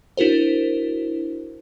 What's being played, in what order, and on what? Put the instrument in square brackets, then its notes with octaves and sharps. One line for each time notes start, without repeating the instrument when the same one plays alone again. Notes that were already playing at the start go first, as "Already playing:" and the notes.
[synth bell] D4 E4 F#4 A#4 C5